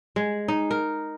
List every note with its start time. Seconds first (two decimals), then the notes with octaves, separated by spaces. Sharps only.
0.16 G#3
0.48 D#4
0.71 A#4